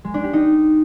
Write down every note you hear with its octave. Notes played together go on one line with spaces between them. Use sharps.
G#3
D4
G4
D#4